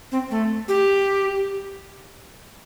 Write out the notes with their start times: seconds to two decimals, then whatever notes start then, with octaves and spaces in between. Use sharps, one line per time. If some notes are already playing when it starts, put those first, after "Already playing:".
0.12 C4
0.31 A3
0.68 G4